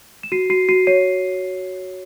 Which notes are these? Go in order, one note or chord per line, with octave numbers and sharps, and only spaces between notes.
E7
F#4 C7 D#7
F#4 C7 D#7
F#4 C7 D#7
C#5 C7 D#7